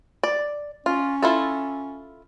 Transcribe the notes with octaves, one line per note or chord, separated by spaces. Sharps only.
D5
C#4 F4
E4 F4 A4